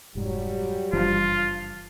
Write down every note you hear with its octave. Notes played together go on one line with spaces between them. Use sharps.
F1 G#2 F#3 G3 G4
F#1 G2 E3 F3 F4